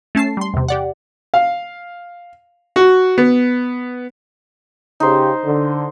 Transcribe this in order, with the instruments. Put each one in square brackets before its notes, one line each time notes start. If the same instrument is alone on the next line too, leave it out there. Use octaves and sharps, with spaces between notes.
[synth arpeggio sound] A3 C#4 A5 C7
G3 C6
E2 C3
G4 D5 F#5
[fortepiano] F5
F#4
B3
[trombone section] C#3 G4 [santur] D#4 C5
[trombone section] D3